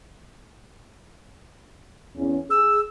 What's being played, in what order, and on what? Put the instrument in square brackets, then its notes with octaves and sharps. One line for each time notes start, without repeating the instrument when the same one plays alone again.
[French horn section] E2 C#4
[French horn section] G#4 [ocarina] E6